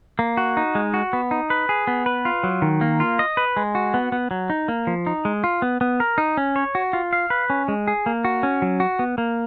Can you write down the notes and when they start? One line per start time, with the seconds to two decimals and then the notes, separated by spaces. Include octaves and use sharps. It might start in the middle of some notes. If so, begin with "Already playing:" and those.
0.19 A#3
0.37 F#4
0.57 D#4
0.75 G#3
0.94 F#4
1.13 B3
1.31 D#4
1.50 B4
1.69 G#4
1.87 B3
2.06 B4
2.25 F4
2.43 F#3
2.62 D#3
2.81 A#3
3.00 F4
3.19 D#5
3.37 B4
3.57 G#3
3.75 F#4
3.94 B3
4.12 B3
4.31 F#3
4.50 D#4
4.68 A#3
4.87 F3
5.07 D#4
5.25 G#3
5.44 F4
5.62 B3
5.81 B3
6.00 A#4
6.18 D#4
6.37 C#4
6.56 C#5
6.75 F#4
6.93 F4
7.13 F5
7.30 B4
7.50 C#4
7.68 G#3
7.88 G#4
8.06 A#3
8.25 F#4
8.43 C#4
8.62 F#3
8.80 F#4
8.99 B3
9.18 A#3